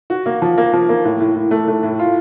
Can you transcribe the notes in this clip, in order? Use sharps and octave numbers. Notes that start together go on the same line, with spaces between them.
F#4
A#3
F3
A#3
F3
A#3
A2
A2
A2
A3
A3
A2
F4